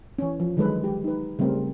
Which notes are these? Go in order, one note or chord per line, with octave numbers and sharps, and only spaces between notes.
E3 C#4
F3
D3 D#3 F#3 G#3 A4 B4
G#3 G4
D#4 B4
C#3 G3 A3 C4 A#4